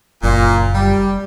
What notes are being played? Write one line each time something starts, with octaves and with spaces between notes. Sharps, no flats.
F#1 A#2
G3